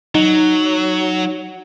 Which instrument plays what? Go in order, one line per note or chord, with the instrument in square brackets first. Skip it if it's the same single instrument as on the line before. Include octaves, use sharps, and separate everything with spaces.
[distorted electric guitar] F#3 [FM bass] D#4